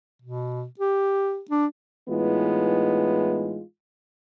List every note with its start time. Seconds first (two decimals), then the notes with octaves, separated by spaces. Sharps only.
0.22 B2
0.79 G4
1.50 D4
2.09 A2 E3 G#3 B3 D#4 F4